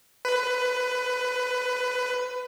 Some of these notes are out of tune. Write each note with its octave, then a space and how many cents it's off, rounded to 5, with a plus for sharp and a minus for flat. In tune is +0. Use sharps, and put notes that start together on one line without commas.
B4 +20